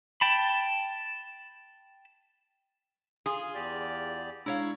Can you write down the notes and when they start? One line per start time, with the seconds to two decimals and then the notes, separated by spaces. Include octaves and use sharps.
0.21 G5 A5 B5
3.26 F4 G#4
3.55 E2 G4 D5
4.46 G#3 D4 E4 C#5 F5 A#5